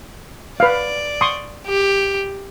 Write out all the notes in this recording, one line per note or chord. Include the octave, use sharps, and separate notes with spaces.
B4 D5 F5
C6 C#6 D#6
G4